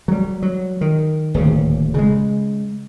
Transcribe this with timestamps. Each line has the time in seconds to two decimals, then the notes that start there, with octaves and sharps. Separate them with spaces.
0.08 F#3 G3
0.42 F#3
0.81 D#3
1.34 D1 D#2 C#3
1.94 C#3 G#3